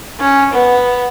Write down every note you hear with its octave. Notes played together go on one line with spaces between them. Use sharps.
C#4
B3